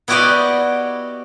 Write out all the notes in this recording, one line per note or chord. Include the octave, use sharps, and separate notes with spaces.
B3 E4 F#4 G4 D5 D#5